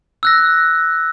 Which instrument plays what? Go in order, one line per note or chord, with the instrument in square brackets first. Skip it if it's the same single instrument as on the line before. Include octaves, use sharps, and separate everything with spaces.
[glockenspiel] E6 F#6 A#6